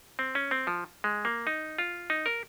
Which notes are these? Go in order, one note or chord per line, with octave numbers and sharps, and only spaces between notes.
C4
C#4
C4
F3
G#3
A#3
D#4
F4
D#4
A#4